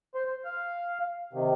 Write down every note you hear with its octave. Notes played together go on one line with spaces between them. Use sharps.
C5
F5
C3 D#3